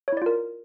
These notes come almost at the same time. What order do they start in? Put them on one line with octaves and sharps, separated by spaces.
C#5 E4 D5 F4 A#4